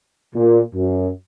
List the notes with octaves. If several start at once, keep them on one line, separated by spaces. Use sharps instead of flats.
A#2
F#2